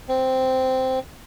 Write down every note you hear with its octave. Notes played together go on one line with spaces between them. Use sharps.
C4